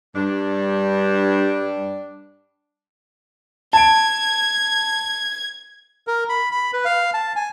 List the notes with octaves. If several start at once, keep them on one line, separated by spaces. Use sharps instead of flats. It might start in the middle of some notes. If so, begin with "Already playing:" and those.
G2 G3 D4
A5 G#6 D7
A#4
B5
B5
B4
F5
A5
G#5